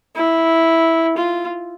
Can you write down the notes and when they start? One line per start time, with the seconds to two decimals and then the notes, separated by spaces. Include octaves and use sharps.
0.15 E4
1.17 F4